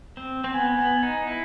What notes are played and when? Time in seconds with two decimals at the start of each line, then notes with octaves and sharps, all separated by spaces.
0.17 C4
0.44 C4
0.54 B3 G#5
0.78 B3
1.03 D#4
1.27 E4